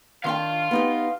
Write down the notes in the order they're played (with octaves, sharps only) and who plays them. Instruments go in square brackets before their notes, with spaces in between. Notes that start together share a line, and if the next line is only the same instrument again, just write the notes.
[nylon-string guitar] D#3 D4 G5 [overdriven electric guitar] F5 C6
[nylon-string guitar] B3 D#4 G4